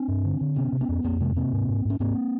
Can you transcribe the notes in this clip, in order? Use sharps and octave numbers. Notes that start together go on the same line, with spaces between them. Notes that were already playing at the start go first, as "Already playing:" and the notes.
Already playing: C4 D4
G2
D3
D3
C3 B3 C#4
C3
B3 C#4
F2
F2 A#3 C4
C3 G#3 A#3
C3 A#3 C4
G#2
G#2
G#2 C#4
G#2 A#3 C4